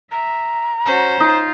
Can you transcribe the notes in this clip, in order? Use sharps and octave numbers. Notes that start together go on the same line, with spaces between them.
E5 A#5
C#4 F#4 C5
D#4 F4